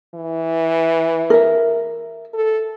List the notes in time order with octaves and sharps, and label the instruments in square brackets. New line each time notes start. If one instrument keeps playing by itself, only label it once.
[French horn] E3
[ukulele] A#4 E5
[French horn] A4